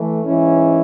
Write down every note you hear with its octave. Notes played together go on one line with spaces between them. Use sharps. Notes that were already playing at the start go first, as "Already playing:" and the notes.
Already playing: E3 A3
G#2 E3 C#4 E4